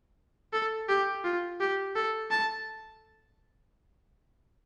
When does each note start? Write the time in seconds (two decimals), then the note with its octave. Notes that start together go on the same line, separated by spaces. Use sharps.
0.53 A4
0.89 G4
1.24 F4
1.60 G4
1.96 A4
2.31 A5